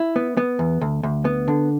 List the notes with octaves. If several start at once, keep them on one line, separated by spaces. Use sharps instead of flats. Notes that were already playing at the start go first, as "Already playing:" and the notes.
Already playing: E4
B3
B3
E2
D2
D2
B3
D3